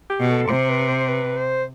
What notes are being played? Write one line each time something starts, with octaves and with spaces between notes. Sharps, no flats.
G4
B2
A4
C3 C5
B4
C5
B4
C5